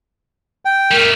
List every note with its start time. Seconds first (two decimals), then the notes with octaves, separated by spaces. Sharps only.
0.65 G5
0.91 G3 A3 A#4